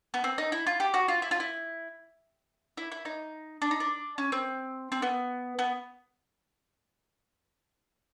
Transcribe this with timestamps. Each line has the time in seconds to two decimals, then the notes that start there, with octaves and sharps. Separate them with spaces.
0.14 B3
0.24 C4
0.38 D#4
0.52 E4
0.67 F4
0.80 G4
0.94 F#4
1.08 F4
1.22 E4
1.31 F4
1.40 E4
2.77 E4
2.92 E4
3.05 D#4
3.62 D4
3.71 D#4
3.80 D4
4.18 C#4
4.32 C4
4.92 C4
5.02 B3
5.59 B3